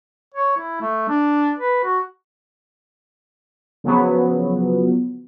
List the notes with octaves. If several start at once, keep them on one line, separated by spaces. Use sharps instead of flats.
C#5
E4
A3
D4
B4
F#4
C#3 F3 F#3 B3